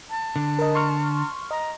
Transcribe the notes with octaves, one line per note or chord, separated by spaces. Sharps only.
A5
D3
A#4 D#5
C6 C#6 F6
D#5 A#5